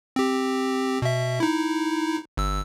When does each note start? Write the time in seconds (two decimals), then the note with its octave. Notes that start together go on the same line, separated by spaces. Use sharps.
0.16 C4 G4
1.02 B2 E5
1.40 D#4 E4
2.37 G1 E6